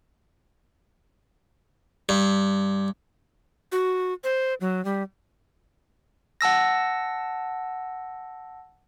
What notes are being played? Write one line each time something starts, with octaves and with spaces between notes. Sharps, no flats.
G2
F#4
C5
F#3
G3
F#5 A5 E6 A#6